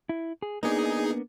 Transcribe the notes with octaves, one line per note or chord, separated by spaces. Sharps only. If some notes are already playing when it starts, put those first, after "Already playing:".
E4
G#4
A#3 B3 D4 D#4 G#4